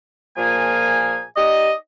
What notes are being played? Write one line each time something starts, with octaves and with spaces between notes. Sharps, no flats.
A#2 F3 A#3 G#4 G#5
D#4 G4 D5 D#5